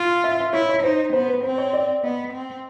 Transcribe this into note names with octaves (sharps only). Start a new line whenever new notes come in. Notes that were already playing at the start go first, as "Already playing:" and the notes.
Already playing: F4
E5
F5
E5
E4 C#5
C#5
D#4 C5
B3 C5
B4
C4 C5
C#5
D5
B3 D#5
C4